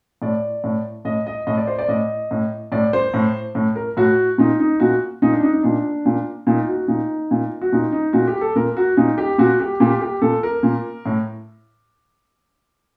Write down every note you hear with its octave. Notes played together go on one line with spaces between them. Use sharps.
A2 D5
A2
A2 D#5
D#5
A2 D#5
D5
C5
D5
A2 D#5
A2
A2 D5
C5
A2
A2
A#4
A2 F#4
A#2 D#4
D#4
A#2 F#4
A#2 D#4
D4
D#4
D#4
A#2 D4
A#2
A#2 D#4
F#4
A#2 D#4
A#2
F#4
A#2 D#4
D#4
A#2 F#4
G4
A4
A#2 A#4
F#4
A#2 D#4
G4
A#2 F#4
G4
A#2 G4
G4
A#2 A4
A#4
A#2
A2